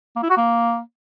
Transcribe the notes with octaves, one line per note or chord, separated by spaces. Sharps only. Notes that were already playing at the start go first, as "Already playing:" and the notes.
A#3
E4
F#4
A#3